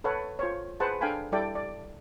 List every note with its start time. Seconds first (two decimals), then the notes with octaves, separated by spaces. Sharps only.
0.04 A4 B4 C#5 F#5
0.39 F4 C5 C#5
0.80 G#4 B4 C5 F#5 A5
1.01 D4 A4 F5 G5 G#5 B5
1.32 G3 E4 A4 D5 G5
1.55 D5